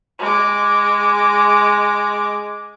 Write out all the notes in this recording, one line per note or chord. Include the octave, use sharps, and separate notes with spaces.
G#3 D6